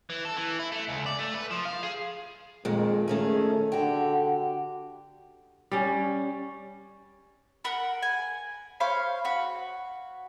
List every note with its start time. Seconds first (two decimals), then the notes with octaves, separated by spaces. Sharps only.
0.10 E3
0.25 A4
0.37 E3
0.59 E4
0.72 A3
0.89 C#2
1.06 D5
1.19 A3
1.35 B4
1.51 F3
1.66 F5
1.83 G#4
2.65 F2 A#2 D#3 G#3
3.08 D#3 A3 C#4 G#4
3.72 D3 F#4 G4
5.72 G3 C#4
7.64 A#4 F#5 B5
8.02 G#5
8.80 C5 C#5 F5 B5
9.25 F#4 F#5 B5